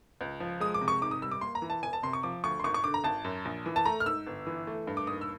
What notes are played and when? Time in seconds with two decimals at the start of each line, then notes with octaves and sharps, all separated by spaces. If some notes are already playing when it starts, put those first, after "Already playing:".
0.21 C#2
0.40 F3
0.60 G#3 D#6
0.74 D6
0.81 C3
0.88 C#6
1.01 G#2 D6
1.11 D#6
1.22 G3 E6
1.31 D6
1.41 A#3 C6
1.55 A#5
1.62 E3
1.70 A5
1.82 E1 G#5
1.93 A5
2.03 C3 C6
2.13 C#6
2.23 F3 D6
2.44 D2 C#6
2.59 C6
2.64 G#1 C#6
2.74 C#6
2.84 D3 D6
2.94 A#5
3.04 G#1 A5
3.24 F#2
3.45 A#1
3.66 E3
3.76 A5
3.85 A3 A#5
4.00 F6
4.06 G#2 E6
4.27 G1
4.47 E3
4.67 A3
4.87 G2
4.97 D6
5.07 D#2 D#6
5.21 E6